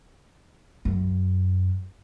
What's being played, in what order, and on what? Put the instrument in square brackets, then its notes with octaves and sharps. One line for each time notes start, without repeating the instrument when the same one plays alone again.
[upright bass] F#2